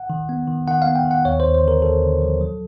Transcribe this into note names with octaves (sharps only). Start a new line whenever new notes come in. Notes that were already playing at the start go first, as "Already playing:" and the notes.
Already playing: F#5
D#3
B3
D#3
D#3 F#5
B3 F5
G5
D#3
F#5
D#2 C#5
D#2 C5
C5
D3 A#4
D#2 A4
D3
F3
F#3